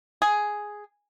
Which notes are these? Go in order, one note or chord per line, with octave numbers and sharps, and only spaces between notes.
G#4